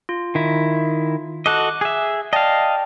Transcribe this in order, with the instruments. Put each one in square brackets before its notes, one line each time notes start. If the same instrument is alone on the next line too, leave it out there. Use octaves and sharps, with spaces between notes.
[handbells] F4
[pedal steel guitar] D#3 E4
[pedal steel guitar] F#4 A4 D#5 [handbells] D6 F#6
[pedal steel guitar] G#4 E5
[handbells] D5 G5 A5 [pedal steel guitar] D#5 F5